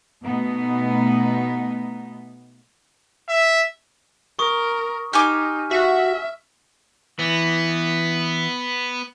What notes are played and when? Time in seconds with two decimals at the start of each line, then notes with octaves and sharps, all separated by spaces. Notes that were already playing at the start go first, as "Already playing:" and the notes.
0.22 B2 A3 B3 D#4
3.29 E5
4.39 A#4 C#6 D#6
5.13 D#4 G4 G#5 D6 F6
5.71 F#4 E5 B6
7.19 E3 B3